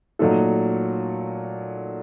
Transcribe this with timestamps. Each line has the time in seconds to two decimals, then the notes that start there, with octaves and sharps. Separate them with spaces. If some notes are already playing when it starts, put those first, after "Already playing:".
0.19 A#2 F#3 A3 D#4 A4